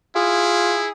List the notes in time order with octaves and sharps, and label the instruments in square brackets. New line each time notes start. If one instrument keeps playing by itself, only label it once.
[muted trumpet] E4 [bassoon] F4 [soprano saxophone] G#4